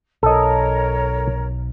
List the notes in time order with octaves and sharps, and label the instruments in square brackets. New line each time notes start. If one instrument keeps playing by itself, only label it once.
[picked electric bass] B1 [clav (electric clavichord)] A4 D#5 [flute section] A#4 C#5